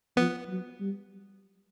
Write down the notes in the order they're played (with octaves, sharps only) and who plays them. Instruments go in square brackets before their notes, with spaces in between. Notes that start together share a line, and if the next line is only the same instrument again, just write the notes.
[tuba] F3 [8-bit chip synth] B3
[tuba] F#3
G3